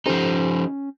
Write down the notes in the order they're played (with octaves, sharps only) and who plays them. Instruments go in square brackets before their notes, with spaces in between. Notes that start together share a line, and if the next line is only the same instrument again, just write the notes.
[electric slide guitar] F3 D#4 [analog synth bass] C#4 [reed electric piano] G4 A4 C5